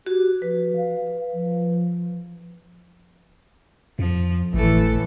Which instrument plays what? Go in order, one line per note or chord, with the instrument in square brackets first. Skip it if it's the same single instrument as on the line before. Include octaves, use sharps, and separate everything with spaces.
[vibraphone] F#4 [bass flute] G4
[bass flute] F3 [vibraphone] B4
[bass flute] F5
F3
[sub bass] F2 [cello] F3
[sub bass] G#1 [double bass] A2 E3 [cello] A3 A4